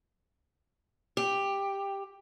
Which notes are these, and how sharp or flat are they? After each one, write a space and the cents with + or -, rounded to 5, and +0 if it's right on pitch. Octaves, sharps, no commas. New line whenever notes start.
G4 +10